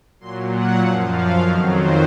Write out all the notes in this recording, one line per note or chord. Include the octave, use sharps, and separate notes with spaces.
A#2 F#3 C6
F#5
F#2 F3 F5
F5
F2 D#3 F#3 C#5
C5